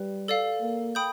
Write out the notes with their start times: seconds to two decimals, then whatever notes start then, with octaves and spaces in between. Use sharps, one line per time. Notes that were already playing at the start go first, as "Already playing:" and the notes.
Already playing: G3 B4
0.28 A4 D5 F5
0.61 A#3
0.95 G5 B5 D#6 G6